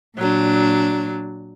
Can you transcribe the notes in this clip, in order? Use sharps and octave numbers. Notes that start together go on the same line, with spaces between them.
A#2 F#3 D4